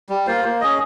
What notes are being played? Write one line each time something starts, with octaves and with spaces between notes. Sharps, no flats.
G3
A#3 F4 C5
A#3
C#4 G#4 D#5